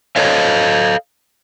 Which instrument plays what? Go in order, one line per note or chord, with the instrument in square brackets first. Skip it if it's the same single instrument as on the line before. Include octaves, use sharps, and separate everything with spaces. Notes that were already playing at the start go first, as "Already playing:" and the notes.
[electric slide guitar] A4 C#5 D#5 F5